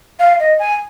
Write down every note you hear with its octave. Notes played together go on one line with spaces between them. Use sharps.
F5
D#5
G#5